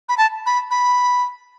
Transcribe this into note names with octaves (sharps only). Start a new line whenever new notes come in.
B5
A5
B5
B5